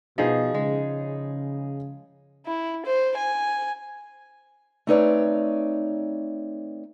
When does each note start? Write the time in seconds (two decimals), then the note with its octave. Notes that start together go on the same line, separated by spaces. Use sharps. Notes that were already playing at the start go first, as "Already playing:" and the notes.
0.18 B2 F3 D#4 G#4
0.54 C#3 G#3
2.46 E4
2.86 C5
3.17 G#5
4.87 A3 C4 D#4 B4 C#5 D5